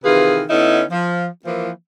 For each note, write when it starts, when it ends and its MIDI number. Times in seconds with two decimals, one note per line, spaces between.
0.05 0.43 48
0.05 0.43 51
0.05 0.43 52
0.05 0.43 65
0.05 0.43 68
0.05 0.43 71
0.50 0.82 50
0.50 0.82 59
0.50 0.82 61
0.50 0.82 63
0.50 0.82 64
0.91 1.26 53
1.45 1.70 52
1.45 1.70 53
1.45 1.70 58